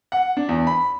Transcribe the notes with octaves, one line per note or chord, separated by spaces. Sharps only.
F#5
D4
E2
B5